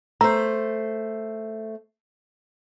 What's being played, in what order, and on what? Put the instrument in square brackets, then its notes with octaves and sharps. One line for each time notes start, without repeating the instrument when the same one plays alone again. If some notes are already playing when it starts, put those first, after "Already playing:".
[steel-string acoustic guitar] A3 C5 [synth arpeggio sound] A#5